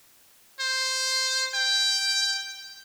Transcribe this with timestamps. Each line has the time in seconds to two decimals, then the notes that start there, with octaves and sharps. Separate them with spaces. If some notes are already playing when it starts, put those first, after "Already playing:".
0.60 C5
1.54 G5